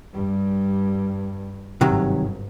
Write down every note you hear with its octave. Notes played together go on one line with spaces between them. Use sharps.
G2 G3
G1 G#2 C3 D#3 F#3